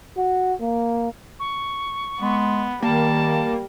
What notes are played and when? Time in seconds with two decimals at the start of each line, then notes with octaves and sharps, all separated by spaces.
0.18 F#4
0.61 A#3
1.39 C#6
2.20 G#3 B3
2.82 D#3 G3 A#3 A5